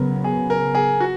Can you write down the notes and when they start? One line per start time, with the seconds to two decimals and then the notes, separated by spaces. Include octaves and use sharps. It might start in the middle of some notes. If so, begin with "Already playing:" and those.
Already playing: C#3 F#3 B3 A#4
0.24 G#4
0.50 A#4
0.75 G#4
1.00 F#4